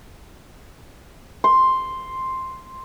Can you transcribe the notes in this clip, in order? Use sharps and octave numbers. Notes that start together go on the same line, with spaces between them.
C6